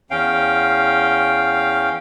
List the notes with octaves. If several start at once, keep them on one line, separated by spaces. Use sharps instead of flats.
E2 C#4 F5 G5